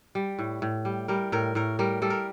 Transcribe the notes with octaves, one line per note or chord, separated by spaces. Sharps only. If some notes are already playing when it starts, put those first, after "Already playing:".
G3
A2
A2
G3
G3 A#4
A2 A#4
A2 A#4
G3 A#4
G3 A4
A#4